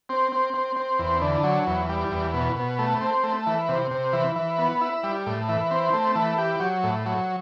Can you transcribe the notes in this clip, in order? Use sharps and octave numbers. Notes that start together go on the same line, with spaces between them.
C4
C4
C4
C4
E2
D3
F#3
E2
G3
E2
B2
B2
A3
C4
A3
E3
C3
C3
E3
E3
B3
E4
G3
A2
E3
C4
A3
E3
G4
F#3
A2
F#3